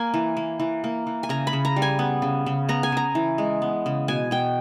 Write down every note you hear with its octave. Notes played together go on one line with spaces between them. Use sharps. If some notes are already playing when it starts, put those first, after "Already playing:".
Already playing: A#3 G#5
E3
A#3
E3
A#3
E3
G#5
C#3 A#5
B5
C#3
A#5
G3
G#5
B3
C#3
C#3
B3 A#5
G#5
C#3 A#5
E3
G#3
B3
C#3
B2 G#5
B2 G5